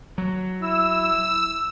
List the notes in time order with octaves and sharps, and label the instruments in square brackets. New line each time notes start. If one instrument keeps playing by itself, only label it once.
[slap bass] F#3
[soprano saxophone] E4 [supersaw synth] E6